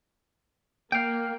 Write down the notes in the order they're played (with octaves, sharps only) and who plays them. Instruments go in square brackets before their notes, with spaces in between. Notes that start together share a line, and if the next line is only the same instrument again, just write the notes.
[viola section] A#3 [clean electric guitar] F5 G5